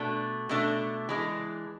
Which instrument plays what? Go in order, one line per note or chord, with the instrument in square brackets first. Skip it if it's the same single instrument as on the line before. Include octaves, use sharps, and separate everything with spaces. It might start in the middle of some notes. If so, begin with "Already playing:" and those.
Already playing: [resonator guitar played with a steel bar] B2 A3 D4
B2 A3 D4
E3 G#3 D4